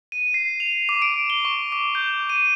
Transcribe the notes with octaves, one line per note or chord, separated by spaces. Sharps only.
D#7
C7
F7
D6
D7
G7
C#6
D6
G6
D#7